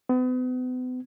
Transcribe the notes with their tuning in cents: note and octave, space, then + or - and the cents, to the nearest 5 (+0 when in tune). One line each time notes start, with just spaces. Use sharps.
B3 +40